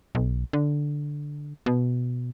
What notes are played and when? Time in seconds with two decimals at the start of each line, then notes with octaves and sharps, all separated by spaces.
0.15 B1
0.53 D3
1.66 B2